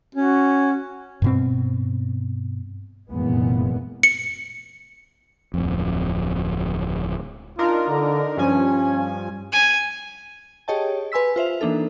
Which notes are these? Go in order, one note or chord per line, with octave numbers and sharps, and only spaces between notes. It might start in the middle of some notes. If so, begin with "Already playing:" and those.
C#4 F#4
G2 B2 C4
F1 F#2 A#2 E3 G#3 B3
C#7
D1 F2
D4 D#4 F4 A#4
D3
G2 F3 C#4 G#5
G#5
G4 G#4 C#5 D#5 G5 A5
B4 G#5 C6 E6 B6
F4 C5 E5 F7
E3 A#3 D4 D#4 A4